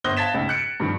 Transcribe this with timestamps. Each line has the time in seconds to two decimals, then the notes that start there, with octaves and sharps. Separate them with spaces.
0.04 G1 C5 D#6 F#6 A#6 G7
0.17 F5 A5 G#6 A6 B6 E7
0.34 C#2 G#2
0.49 F#6 C#7 D7
0.80 G2 D#3 F3